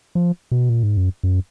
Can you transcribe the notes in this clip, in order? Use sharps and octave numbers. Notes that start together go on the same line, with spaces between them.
F3
B2
A#2
G#2
F#2
F#2